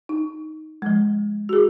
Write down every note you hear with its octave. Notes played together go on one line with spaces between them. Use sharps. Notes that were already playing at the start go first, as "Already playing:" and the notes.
D#4
F3 G#3
F#4 G#4